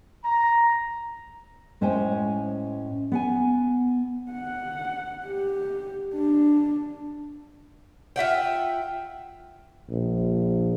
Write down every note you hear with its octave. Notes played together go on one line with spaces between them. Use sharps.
A#5
A2 G#3 C#4 C5 G5 G#5
B3 F#5 G#5
F#5
G4
D4
F4 E5 F#5 G5
A#1